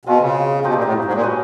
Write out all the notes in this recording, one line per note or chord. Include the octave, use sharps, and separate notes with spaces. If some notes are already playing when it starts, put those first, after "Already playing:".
B2 C4 F4 G#4
C#3
B2 A3 C4 D#4 G4
A#2
A2
G#2
G#2
A#2
C#4 F#4 B4 D#5